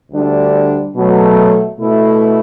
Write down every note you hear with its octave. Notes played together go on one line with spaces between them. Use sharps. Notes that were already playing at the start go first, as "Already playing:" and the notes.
D2 D3 G3 D4
B2 F#3 A3
B2 A3 E4